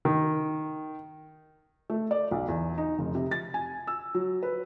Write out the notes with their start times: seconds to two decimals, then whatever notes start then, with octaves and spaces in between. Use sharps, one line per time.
0.05 D#3
1.90 A3
2.11 D5
2.31 B1
2.48 E2
2.78 D#4
2.99 F1
3.15 C3
3.31 A6
3.54 G#5
3.87 E6
4.14 F#3
4.43 B4